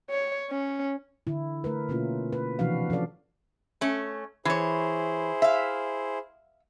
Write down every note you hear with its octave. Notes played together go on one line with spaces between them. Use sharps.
C#5
C#4
D3 E4
A3 A#4 B4
B2 A#3 C#4 E4 F4
B4
C3 E3 F3 D4 F#4 F5
F3 C#4 A4 D5 F5
A3 C#4
E3 E4 G#4 C5 C#5
E5 F5